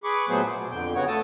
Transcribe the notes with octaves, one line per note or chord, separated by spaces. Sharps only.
G#4 B4 C#6 D6
A#2 F#3 A3 B3 G#4 C5
B2
F2 D3 G5
C#3 B3 F#4 C#5
A3 A4 A5 D#6